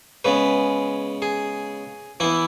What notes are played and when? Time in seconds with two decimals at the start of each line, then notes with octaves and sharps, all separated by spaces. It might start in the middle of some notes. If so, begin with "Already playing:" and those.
0.25 C#3 G#3 B3 B4
1.22 G#4
2.20 E3 B3 E4